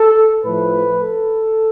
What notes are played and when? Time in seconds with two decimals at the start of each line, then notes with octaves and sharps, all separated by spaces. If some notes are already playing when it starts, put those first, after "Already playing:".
Already playing: A4
0.44 A2 F3 A3 B4
1.00 A4